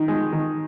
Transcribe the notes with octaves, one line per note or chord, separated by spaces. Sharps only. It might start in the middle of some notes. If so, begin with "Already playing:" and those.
Already playing: D#3
G#3
D#3